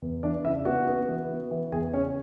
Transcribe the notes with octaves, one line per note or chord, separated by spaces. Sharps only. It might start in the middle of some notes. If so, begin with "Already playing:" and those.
E2
E3 D4 D5
C#3 E4 E5
B3 F#4 F#5
B3
E3
B3
E3
E2 G#4 G#5
C#3 C#4 C#5